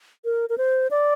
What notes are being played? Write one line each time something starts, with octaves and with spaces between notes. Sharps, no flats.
A#4
A#4
C5
D5